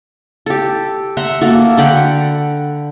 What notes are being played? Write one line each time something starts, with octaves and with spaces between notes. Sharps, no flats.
G4 A4
E5 F#5 A#5 C6
A#3 F#4 A4
D3 F#5 G5 B5